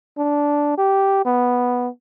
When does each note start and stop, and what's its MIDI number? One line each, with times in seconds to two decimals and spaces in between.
0.18 0.75 62
0.78 1.24 67
1.25 1.88 59